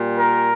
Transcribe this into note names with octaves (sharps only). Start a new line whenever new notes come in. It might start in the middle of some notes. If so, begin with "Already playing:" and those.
Already playing: A#2 G3
A#4